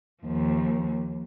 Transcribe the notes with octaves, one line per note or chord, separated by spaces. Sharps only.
D#2 F3